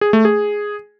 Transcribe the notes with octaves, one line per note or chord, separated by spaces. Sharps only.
G#4
A3
G#4